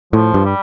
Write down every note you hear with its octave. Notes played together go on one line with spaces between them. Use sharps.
A2 F3
G2
G3